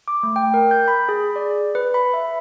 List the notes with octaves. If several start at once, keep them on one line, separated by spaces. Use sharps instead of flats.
D6
A3
G5
A#4
G6
B5
G#4
D5
B4
B5
E5